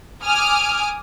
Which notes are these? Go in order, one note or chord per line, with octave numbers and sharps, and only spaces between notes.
G#5 D6 D#6 F6